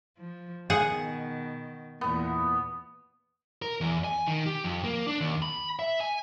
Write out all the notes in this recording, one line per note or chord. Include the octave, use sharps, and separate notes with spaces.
F3
B2 D#3 G#4 F#5
E2 A#2 B3
A#4
E2
G#5
D#3
G4
F2
A#3
D4
D#2
B5
E5
G#5